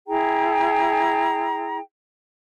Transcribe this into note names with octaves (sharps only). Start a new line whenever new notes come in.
E4 G#4 G5 A#5